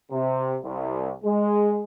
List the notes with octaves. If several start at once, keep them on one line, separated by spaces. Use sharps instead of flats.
C3
C2
G#3